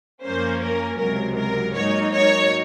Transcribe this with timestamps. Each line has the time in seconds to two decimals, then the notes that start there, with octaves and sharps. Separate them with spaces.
0.24 F#2 F3 A#3 C#4 C5
0.62 A#4
0.99 C#2 C3 F#3 A#4
1.37 A#4
1.75 G#2 F#3 A#3 D#4 C#5
2.13 C#5